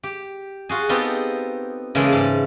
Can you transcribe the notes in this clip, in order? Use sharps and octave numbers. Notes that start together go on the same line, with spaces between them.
G4
F4 F#4 G#4
B3 C4 D#4 F4 G4 A4
C#3 E3 G#3 A#3 G#4 A4
G#2 A5